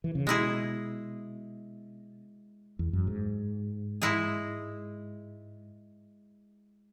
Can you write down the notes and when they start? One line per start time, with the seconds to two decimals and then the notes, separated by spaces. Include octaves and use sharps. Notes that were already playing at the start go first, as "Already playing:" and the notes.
0.04 E3
0.15 C#3
0.27 B2 G#3 E4 G#4
2.79 E2
2.93 F#2
3.07 G#2
4.02 G#3 E4 G#4